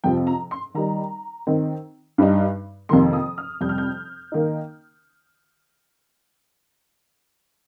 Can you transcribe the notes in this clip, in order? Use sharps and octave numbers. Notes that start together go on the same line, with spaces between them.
F2 C3 F3 G5
A#5
C6
D#3 G3 D#4 A#5
D#3 C4 D#4
G2 G3 D#4
F2 C3 D#3 A#3 C6
D#6
F6
F2 C3 G3 G6
F6
G6
D#3 A#3 D#4